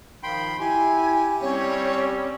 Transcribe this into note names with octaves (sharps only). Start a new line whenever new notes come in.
D#3 F3 G5 B5 C6
E4 G4 G#5
G3 C4 C#4 C#5